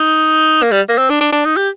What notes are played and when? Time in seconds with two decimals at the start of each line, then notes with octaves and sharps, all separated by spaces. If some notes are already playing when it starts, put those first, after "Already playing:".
Already playing: D#4
0.63 A#3
0.72 G3
0.89 A#3
0.98 C4
1.10 D4
1.21 D4
1.32 D4
1.45 D#4
1.57 G4